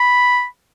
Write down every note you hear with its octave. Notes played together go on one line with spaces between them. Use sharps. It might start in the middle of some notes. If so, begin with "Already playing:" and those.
Already playing: B5